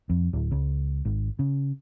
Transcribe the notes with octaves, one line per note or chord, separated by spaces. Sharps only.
F2
D1
C#2
G#1
C#3